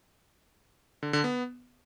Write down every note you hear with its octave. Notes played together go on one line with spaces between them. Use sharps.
D3
D3
B3